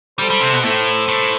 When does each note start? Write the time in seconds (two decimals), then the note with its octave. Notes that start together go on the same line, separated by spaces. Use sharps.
0.19 G3 A4 C5
0.30 G3
0.41 C3
0.53 B2
0.63 A2 A4 C5
1.08 A2